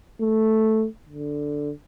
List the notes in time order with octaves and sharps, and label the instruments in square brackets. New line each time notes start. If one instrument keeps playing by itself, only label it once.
[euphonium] A3
D3